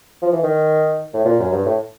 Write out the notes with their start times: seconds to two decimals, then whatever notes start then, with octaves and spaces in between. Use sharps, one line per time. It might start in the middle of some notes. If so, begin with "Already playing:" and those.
0.22 F3
0.32 E3
0.43 D#3
1.14 A2
1.25 A#2
1.39 F#2
1.52 G2
1.66 A2